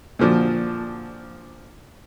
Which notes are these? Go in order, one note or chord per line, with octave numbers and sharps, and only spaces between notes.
A#2 D3 F3 D4 F#4